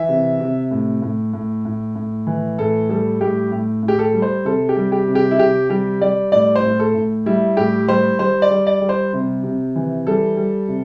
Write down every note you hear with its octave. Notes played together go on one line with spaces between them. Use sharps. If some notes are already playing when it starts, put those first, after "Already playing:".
Already playing: E3 E5
C3
C3
A2
A2
A2
A2
A2
E3
A2 A4
G3 A4
A2 G4
A2
A2
G4
A4
G3
C5
C3 A4
G4
G3
G4
C3
G4
E4
C3 G4
G3 G4
G3 D5
A2 D5
C5
A2
A4
A2
G3 E4
A2 G4
G3 C5
G3 C5
D5
G3
D5
G3
C5
C3
C3
E3
G3 A4
G3
C3